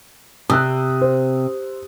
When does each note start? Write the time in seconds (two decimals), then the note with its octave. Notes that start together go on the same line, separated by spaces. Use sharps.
0.50 C3 D#6 E6 F#6
1.01 C5